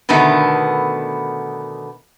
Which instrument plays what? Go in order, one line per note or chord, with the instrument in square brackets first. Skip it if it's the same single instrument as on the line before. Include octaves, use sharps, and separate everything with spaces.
[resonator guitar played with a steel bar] B2 D3 D#3 A3 B3